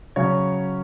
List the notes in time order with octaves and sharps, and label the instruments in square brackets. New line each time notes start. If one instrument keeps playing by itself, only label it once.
[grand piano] C#3 F#3 C#4 C#5